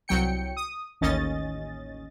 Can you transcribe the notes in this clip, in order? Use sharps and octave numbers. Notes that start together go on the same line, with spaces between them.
C2 F#3 G5 C#7
D#6
A1 D#2 C#4 D#5 A6